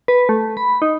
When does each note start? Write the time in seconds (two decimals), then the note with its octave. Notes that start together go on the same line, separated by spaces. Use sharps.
0.08 B4
0.29 A3
0.57 B5
0.82 D#4